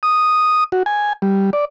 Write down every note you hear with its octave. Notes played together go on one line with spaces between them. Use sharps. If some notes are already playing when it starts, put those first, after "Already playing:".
D#6
F#4
G#5
G3
D5